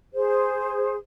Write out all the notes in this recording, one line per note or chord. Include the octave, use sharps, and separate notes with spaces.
G#4 C5